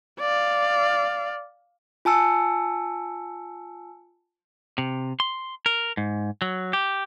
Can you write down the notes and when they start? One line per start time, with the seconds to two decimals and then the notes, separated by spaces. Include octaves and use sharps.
0.20 D5 F5
2.05 F4 G#5 A5 E6 C#7
4.78 C3
5.20 C6
5.66 A#4
5.97 G#2
6.42 F#3
6.73 G4